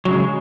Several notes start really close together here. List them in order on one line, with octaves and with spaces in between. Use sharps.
F#3 C#3 G#3